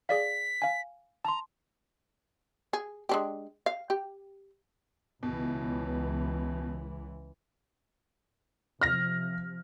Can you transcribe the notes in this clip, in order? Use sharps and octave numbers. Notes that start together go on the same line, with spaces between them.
G#4 D5 F5 B6
F5 G#5
A5 A#5 C6
G#4
G#3 D4 G4
F5
G4
C#2 B2 E3
C3 F3 F6 A#6